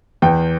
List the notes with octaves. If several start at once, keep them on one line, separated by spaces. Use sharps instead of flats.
E2 G5